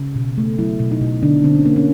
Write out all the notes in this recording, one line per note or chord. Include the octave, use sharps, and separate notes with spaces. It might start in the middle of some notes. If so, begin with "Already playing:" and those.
Already playing: C#3
B2
A3
F#3 E4
B2
D#4
B2
D3 D4
D3 C4
C#4
A#3
C#4